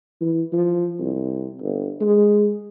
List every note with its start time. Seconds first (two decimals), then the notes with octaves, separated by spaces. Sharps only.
0.21 E3
0.53 F3
0.99 C2
1.61 G1
2.01 G#3